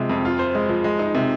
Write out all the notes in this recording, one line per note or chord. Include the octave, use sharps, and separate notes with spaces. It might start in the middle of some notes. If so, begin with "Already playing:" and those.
Already playing: C3 F3 G#3
F2
F4
C5
G#3
F3
G#3
D#4
C3